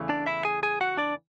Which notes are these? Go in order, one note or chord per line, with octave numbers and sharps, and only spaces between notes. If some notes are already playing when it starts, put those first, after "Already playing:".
Already playing: E2 C#3 E3 A3
D4 D5
E4 E5
G#4 G#5
G#4 G#5
F#4 F#5
D4 D5